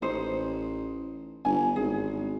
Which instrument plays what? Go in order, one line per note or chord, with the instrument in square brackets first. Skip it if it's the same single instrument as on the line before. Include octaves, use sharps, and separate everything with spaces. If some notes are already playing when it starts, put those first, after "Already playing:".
[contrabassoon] A1 [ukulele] D#4 C5
[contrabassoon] G1 [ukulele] G#5
[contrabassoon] G#1 [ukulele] G#4